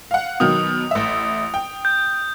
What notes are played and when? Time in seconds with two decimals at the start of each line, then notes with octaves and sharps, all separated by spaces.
0.11 F5 F#5
0.40 B2 D#3 F#3 D#6
0.91 A1 E5
1.54 G5
1.85 G6